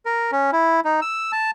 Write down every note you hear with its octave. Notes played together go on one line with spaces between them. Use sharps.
A#4
C#4
E4
D#4
E6
A5